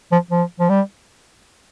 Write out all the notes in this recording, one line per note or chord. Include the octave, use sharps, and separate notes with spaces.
F3
F3
F3
G3